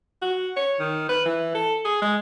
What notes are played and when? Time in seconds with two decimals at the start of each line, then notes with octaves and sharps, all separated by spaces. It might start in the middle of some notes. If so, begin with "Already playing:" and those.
0.22 F#4
0.57 C#5
0.80 D#3
1.09 B4
1.25 E3
1.55 A4
1.85 G#4
2.02 G#3